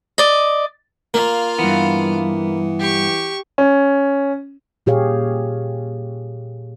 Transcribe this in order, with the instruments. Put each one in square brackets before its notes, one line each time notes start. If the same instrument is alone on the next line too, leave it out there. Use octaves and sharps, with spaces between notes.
[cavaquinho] D5 D#5
[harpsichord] A#3 [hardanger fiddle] F4 F5
[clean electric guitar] G2 B3 [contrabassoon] E3
[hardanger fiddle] G4 C#6
[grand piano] C#4
[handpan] A#2 G4 G#4 C#5 F5